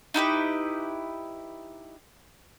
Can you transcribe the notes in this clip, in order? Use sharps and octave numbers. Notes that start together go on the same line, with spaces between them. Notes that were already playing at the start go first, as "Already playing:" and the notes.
D#4 E4 G4 B4